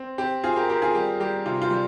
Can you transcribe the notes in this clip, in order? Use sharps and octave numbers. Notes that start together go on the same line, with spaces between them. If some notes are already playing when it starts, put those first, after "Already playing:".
Already playing: C4
C4 G4
C4 F4 G#4
G4 A#4
C4 G4 A#4
F4 G#4
G3 G4
G3 G4
C3 F4
F4
G3